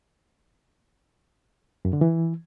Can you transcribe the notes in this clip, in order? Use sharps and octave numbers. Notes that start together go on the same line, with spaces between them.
F#2
D3
E3